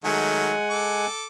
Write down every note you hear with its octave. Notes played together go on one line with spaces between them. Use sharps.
D#3 F#3 G#3 A3 F#5 G#5
A4 D6